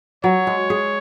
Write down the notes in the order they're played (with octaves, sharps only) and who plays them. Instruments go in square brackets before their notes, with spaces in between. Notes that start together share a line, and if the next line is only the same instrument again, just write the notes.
[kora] F#3 [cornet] C#5
[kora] G#3
G#4